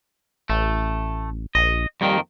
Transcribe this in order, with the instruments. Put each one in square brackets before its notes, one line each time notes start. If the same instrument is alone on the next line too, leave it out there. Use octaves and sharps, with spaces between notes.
[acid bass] A1 [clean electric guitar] A3
[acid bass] A#1 [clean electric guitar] D#5
[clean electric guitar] F2 D#3 A#3 [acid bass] G3